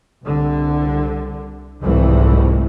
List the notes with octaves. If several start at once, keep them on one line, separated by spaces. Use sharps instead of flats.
C2 D3
F1 C2 F2 G#2 E3 A3